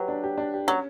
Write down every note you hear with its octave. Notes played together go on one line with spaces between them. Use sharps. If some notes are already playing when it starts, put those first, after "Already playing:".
Already playing: F#3 G4 B4
D4
G4
D4
G4
F#3 C#4